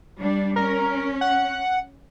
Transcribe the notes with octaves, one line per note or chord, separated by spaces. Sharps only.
G3 D4
C#4 A#4
F#5